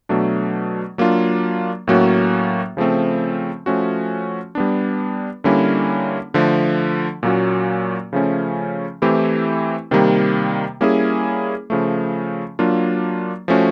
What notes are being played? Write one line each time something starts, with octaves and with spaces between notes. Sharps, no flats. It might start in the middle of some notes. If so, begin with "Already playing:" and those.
B2 F#3 A3 D4
F#3 A#3 D4 F4
A2 F#3 A#3 C#4 F#4
C#3 F3 A3 C4
F3 A3 C#4 F#4
G3 B3 D4
D3 G3 A#3 C#4 E4
D3 F3 A3
A#2 F#3 A#3 C#4 F#4
C#3 F3 A3 C#4
E3 A3 C4 E4 G4
C3 D#3 G3 A#3
G3 A#3 C#4 E4 G#4
C#3 F3 A3
F#3 A#3 D4 F4
F3 A3 C#4 F#4